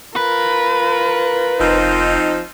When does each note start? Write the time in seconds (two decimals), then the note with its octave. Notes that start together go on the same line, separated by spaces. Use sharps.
0.16 F4 A#4 B4
1.60 F1 F3 C4 D#4